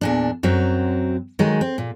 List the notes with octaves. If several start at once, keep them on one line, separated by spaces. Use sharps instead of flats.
E2 A#2 D4
F#2 F#3 C4
D#3 F#3 G#3
C4
A#2